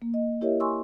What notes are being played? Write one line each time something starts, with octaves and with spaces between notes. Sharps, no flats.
A#3
D#5
E4 G4 A#4 C#5 D#5 E5
G#5 C6 C#6 E6